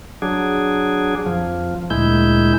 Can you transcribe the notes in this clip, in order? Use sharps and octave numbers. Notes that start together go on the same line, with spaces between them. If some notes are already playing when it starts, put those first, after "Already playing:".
F#3 D4 G#4
F2 F3
D2 A#2 G#3 E4 G6